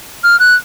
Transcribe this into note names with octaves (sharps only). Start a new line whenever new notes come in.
F6
F#6